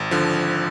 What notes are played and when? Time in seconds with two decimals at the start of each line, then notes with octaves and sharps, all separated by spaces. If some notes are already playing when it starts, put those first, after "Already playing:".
Already playing: G#1
0.11 D3 F3